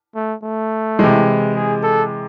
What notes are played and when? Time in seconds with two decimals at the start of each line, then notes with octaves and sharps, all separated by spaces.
0.15 A3
0.43 A3
0.99 C3 E3 G#3
1.55 G#4
1.83 A4